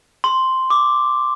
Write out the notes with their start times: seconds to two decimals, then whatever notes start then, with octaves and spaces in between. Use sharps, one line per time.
0.24 C6
0.70 D6